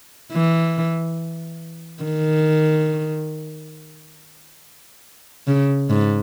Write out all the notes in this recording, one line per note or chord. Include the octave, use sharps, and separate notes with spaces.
E3
D#3
C#3
G#2